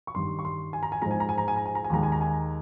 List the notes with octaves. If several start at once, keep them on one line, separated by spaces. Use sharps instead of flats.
C#6
G2 D#3 G3 C6
C#6
C6
G#5
A#5
G#5
G#2 F3 G#3 A#5
G#5
A#5
G#5
A#5
G#5
A#5
G#5
A#5
G#5
D#2 D#3 G#3 A#5
G#5
A#5
G#5